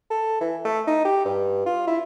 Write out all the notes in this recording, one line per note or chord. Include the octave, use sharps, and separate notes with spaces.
A4
E3
A3
D#4
G4
G2
F4
E4